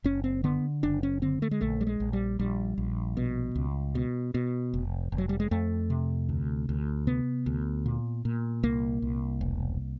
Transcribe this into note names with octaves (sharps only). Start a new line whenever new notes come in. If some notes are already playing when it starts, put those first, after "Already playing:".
F#1 C#4
C4
D3 B3
F#1 D4
C#4
D3 C4
A3
G#3
A#1 A3
G3
G#3
A#1
G3
A#1 G3
A#1
B2
C#2
B2
B2
F1
F1
F#3
G3
G#3
F2 A3
C3
D2
D2
C3 B3
D2
A#2
A#2
C2 A#3
C2
E1